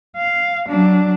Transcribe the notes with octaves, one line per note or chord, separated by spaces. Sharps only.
F5
F#3 D4